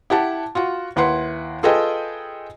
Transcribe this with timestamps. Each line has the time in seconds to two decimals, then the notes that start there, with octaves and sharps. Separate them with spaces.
0.10 E4 G4 F#5 A5
0.55 F4 F#4 F#5
0.96 D#2 E4 B4 F#5 C6
1.63 F4 G#4 A4 B4 D#5 G5